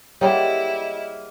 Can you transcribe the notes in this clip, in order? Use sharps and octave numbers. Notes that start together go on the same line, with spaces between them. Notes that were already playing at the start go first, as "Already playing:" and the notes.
G3 G#3 A#3 E4 C#5 D#5 F#5